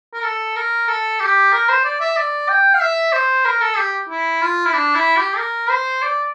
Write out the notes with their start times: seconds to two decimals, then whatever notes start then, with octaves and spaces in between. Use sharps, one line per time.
0.13 A#4
0.24 A4
0.56 A#4
0.88 A4
1.20 G4
1.53 A#4
1.69 C5
1.84 D5
2.00 E5
2.16 D5
2.49 G5
2.74 F5
2.80 E5
3.13 C5
3.45 A#4
3.61 A4
3.77 G4
4.09 E4
4.42 F4
4.66 E4
4.73 D4
4.95 E4
5.16 G4
5.37 A#4
5.70 C5
6.02 D5